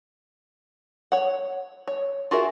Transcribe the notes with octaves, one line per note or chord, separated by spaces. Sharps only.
C#5 F#5
C#5
F4 F#4 G#4 A#4 E5